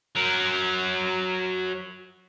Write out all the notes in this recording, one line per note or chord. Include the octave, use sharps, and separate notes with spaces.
F#3 A#4